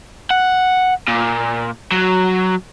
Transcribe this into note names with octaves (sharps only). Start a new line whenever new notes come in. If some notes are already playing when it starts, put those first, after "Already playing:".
F#5
A#2
F#3